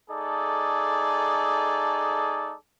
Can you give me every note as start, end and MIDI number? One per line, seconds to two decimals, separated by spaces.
0.10 2.55 57
0.10 2.55 63
0.10 2.55 68
0.10 2.55 69
0.10 2.55 74